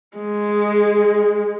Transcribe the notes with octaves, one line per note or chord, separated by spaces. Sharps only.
G#3